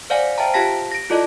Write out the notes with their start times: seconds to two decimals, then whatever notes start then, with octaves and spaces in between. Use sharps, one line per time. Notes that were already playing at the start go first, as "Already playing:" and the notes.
0.10 C5 D5 F5 F#5 G#5
0.38 C5 E5 G5 A5 A#5
0.54 F4 G4 F5 A5 A#6 B6
0.92 A#6 D7
1.10 E4 F4 A4 D5 D#5 A5